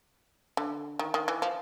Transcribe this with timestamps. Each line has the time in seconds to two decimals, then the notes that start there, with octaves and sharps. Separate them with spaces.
0.57 D3
0.99 D#3
1.14 D#3
1.28 E3
1.42 F3